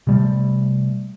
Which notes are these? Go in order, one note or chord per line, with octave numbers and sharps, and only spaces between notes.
C3 G3 A3